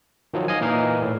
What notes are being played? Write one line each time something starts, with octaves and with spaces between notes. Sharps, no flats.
D#3 F3 F#3
D#5 F5 G#5
A#2 E3 D#4 A#4 F5
A2